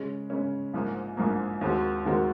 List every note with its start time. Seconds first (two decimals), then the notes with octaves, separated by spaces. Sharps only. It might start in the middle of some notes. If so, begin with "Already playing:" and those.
Already playing: C#3 G#3 C#4
0.30 C#3 G#3 C#4
0.73 A#1 G#2 F3 A#3
1.17 A#1 G#2 F3 A#3
1.61 D#2 D#3 G#3 C4 F#4
2.05 D#2 D#3 G#3 C4 F#4